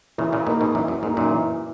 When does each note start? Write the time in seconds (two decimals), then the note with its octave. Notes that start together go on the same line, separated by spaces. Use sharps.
0.18 A#2 C#3 E3
0.32 A#2 C#3
0.46 G#2 B2 A#3 D#4
0.61 G#2 B2
0.74 F#2 A#2 E3
0.88 F#2
1.03 G#2 A#3
1.06 D#4
1.17 F#2 A#2
1.31 E3